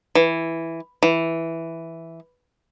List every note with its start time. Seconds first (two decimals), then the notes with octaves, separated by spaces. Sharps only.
0.15 E3
1.03 E3